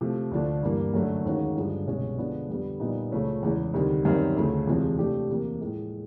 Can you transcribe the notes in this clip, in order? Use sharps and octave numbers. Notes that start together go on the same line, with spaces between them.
C3 F3 A3
D2 D3 F3 A3 D4
G2 E3 G3 A#3
F#2 D3 F#3 A3
D#2 D#3 G#3 C#4 F#4
G2 D3 F3 G#3
C2 B2 G#3 C#4
D3 F3 G#3 B3 D4
F2 D3 G3 B3
A#2 G3 B3 D#4
C#2 C#3 F3 A3 C#4
E2 C#3 E3 G#3
D2 C3 D#3 G3
F#2 D#3 G3 C4
D2 C#3 F3 A3
E2 C3 F3 G#3 C4
C3 F3 A3 D4 G4
E2 C3 F3 A#3
A2 F3 G#3